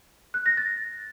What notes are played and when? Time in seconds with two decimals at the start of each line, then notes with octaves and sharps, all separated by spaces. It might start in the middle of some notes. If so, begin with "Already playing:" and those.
0.34 F#6
0.46 A#6
0.57 A6